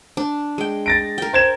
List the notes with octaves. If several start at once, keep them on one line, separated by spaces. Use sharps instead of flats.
D4
G#3 G5
A6 A#6 D7
A#4 G5
C5 G#6 E7